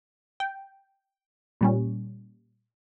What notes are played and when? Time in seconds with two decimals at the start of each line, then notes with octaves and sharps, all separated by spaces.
0.40 G5
1.61 A#2 G3 C#4